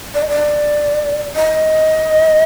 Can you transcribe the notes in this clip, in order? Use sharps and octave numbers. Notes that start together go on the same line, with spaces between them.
D5
D#5
D5
D#5